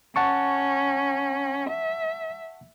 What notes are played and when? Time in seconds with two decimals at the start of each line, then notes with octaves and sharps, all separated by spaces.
0.16 C#4 F#5 A5 C#6
1.70 E5